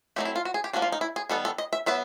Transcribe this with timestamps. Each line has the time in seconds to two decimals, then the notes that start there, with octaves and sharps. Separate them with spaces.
0.16 F#3 A3 C4 D#4 G4
0.25 E4
0.36 F4
0.45 F#4
0.54 G#4
0.64 G4
0.73 F3 A#3 D4 F#4
0.82 F4
0.92 D#4
1.01 E4
1.16 G#4
1.30 D#3 G3 B3 A4
1.45 A4
1.58 D#5
1.73 E5
1.86 F#3 B3 E5